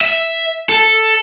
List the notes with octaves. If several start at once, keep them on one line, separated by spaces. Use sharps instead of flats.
E5
A4